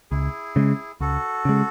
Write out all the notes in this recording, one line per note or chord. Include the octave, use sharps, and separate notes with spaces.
C#2 E4 G#4
C#3 G#3
C#2 F#4 A4
C#3 G#3